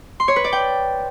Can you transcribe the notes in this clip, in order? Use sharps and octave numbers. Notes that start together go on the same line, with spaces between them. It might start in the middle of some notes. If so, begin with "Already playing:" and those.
C6
C#5
B4
D5
G5